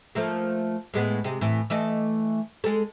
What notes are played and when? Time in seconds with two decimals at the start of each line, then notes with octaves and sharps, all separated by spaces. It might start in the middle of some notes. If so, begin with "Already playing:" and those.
0.15 F3 A3 A#3
0.94 A2 G#3 B3
1.24 C3 G#3
1.41 A2 E3
1.70 E3 A3 D#5
2.64 G#3 A4